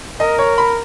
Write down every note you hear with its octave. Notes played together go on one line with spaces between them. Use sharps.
A#4 D#5
C#5
B5